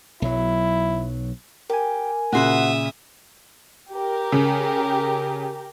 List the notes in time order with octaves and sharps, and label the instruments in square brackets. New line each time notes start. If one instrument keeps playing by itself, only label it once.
[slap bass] B1 F#3 [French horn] E4
[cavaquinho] G4 [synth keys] A#4 G#5
[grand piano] A#2 C#3 [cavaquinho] F#4 C5 F#5 [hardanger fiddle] E5 D#6
[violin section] G4 A#4
[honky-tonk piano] C#3